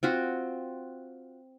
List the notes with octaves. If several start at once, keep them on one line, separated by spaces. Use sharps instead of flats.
C4 F4 F#4